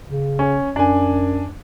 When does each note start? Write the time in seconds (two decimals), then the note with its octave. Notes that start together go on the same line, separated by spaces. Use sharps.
0.09 C#3
0.39 C#4
0.76 F#2 D4 G#5